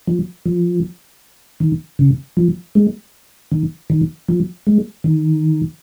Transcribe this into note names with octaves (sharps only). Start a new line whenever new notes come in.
F3
F3
D#3
C#3
F3
G#3
D#3
D#3
F3
G#3
D#3